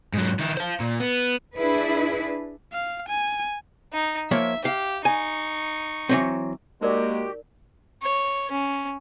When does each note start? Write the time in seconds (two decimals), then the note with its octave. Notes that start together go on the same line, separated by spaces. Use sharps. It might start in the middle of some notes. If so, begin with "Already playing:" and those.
0.14 G#2 F#3
0.39 D#3 E4
0.57 C5 F5
0.80 A#2
1.00 B3
1.57 D4 E4 G#4 B4
2.73 F5
3.08 G#5
3.93 D#4
4.31 F3 A#3 C#5 E5
4.65 G4 F5
5.05 D#4 G#5 C#6
6.09 E3 F#3 C4
6.81 G#3 A#3 D#4 F#4 G4 A#4 D5
8.02 C#5
8.51 C#4